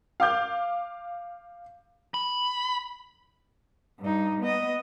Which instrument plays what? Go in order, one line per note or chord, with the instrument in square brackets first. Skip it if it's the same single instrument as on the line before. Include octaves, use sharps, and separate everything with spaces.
[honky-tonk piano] F5 D6 G6
[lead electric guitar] B5
[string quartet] G2 D#4
B3 D#5